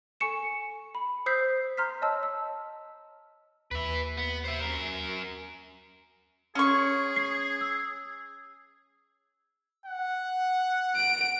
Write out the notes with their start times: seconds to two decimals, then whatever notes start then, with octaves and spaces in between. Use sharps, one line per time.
0.20 A4 G#5 C#6 C#7 E7
0.95 B5
1.26 C5 D#6 E6 G6 B6 C7
1.77 A#5 C6 F6 G6 B6
2.02 C#5 D#5 A5 E6
2.23 E6
3.71 D#2 B4 E5
4.17 B3
4.44 C5 E5
4.61 F#2 A#4
6.55 C#4 G#4 C#6
7.16 C7
7.61 E6
9.85 F#5
10.96 D7